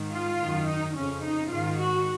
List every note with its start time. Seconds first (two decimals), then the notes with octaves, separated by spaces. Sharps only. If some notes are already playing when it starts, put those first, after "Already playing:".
Already playing: G#2 D#3
0.11 F4
0.40 F#2 D#3
0.67 D#4
0.96 F2 C#3 C#4
1.23 D#4
1.51 G#2 D#3 F4
1.80 F#4